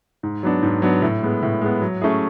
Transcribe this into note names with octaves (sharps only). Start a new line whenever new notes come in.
G#2
F#3 B3 D4
G#2
F#3 B3 D4
A2
G#3 B3
A2
G#3 B3
F#3
A3 C#4 E4 G#4